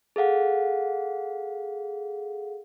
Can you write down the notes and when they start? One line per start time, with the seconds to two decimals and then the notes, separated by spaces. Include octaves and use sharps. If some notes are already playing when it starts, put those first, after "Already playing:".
0.16 G#4 A4 F5 F#5